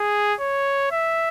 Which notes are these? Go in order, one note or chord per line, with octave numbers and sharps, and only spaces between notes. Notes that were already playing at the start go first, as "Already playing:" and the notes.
Already playing: G#4
C#5
E5